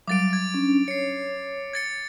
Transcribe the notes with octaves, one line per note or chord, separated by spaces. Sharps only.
F#3 G3 D6 A6 D7
G#6
C#4 D4
C#5 C7 C#7
G#6 A6 C#7